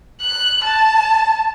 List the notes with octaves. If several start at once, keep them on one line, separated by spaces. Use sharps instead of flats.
F#6
A5